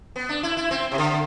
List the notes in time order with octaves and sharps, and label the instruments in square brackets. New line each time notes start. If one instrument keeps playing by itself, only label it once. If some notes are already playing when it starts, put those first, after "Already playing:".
[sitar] B3
D4
E4
E4
C4
C3
D3